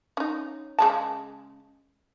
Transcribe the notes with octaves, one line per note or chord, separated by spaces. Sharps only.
C#4 D#4
C#3 G#3 A5